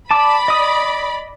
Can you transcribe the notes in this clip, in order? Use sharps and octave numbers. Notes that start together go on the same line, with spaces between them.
D5 A5 B5 D6
D#5 D#6